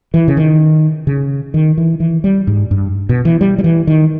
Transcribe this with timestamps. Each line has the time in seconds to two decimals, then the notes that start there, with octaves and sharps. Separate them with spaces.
0.14 E3
0.28 C#3
0.37 D#3
1.07 C#3
1.54 D#3
1.78 E3
2.00 E3
2.24 G3
2.47 G#2
2.71 G2
3.09 B2
3.25 E3
3.41 G3
3.58 G3
3.64 E3
3.87 D#3